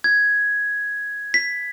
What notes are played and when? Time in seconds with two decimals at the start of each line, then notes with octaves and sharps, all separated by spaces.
0.04 G#6
1.34 B6